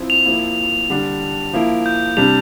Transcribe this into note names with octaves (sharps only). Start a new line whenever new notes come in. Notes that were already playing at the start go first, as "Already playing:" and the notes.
Already playing: F3 C4 E4
F7
F3 A#3 E4
D3 G3 D4
F3 A#3 E4
G6
C3 G3 D4 F7